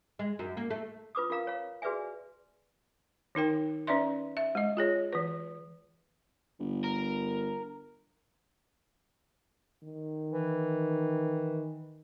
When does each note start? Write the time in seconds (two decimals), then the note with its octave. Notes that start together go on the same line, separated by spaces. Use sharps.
0.19 G#3
0.39 F#2
0.57 A#3
0.71 A3
1.15 F4 B4 D6 D#6
1.30 F4 A#4 F5 A#5
1.47 C#5 F5
1.82 F#4 G#4 B4 D5 E5 G#5
3.35 D#3 D#4 A#4 G5
3.87 C#4 B4 D5 E5 C6
4.37 E5
4.55 G#3 D#5
4.77 F4 G#4 C#5
5.13 E3 B4
6.60 G1
6.84 A#4
9.84 D#3
10.32 E3